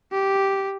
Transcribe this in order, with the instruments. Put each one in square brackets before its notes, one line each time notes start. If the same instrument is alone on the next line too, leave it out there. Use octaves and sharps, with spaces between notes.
[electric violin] G4